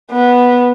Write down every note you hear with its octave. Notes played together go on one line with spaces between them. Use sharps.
B3